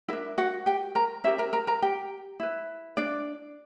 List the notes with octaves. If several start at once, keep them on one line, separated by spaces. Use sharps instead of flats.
D4 E4 A#4 E5
F#4 F#5
G4 G5
A#4 A#5
C#4 E4 G4 A#4 E5
A#4 A#5
A#4 A#5
A#4 A#5
G4 G5
E4 B4
D4 D5